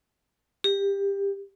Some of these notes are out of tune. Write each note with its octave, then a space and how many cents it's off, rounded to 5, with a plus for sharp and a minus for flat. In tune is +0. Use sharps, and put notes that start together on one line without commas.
G4 +20